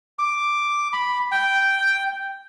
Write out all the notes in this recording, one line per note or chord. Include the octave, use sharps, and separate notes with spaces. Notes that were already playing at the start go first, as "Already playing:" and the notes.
D6
B5
G5